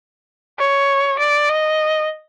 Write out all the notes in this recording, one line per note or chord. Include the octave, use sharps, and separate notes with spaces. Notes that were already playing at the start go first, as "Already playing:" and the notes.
C#5
D5
D#5